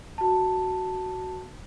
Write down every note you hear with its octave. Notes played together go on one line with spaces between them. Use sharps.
F#4 A5